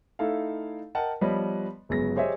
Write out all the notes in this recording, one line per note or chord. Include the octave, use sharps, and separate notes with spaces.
A3 D#4 E4 A4 F5
A#4 D#5 F#5 G5 A5
F3 G3 B3 B4 C#5 D#5
G1 C#3 F#3 G#3 B3 A#6
G4 G#4 C5 C#5 D#5 E5